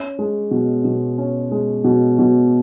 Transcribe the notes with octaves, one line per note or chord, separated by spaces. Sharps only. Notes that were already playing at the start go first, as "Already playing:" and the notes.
Already playing: C#4
G#3
B2
B2
C#4
G#3
B2
B2